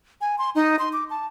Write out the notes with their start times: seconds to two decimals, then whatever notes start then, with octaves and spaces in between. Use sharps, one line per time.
0.21 G#5
0.38 C6
0.55 D#4
0.79 C6
0.93 D6
1.10 A5